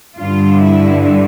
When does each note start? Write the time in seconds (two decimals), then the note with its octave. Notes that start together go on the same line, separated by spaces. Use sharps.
0.18 G2 D3 F4
0.64 E4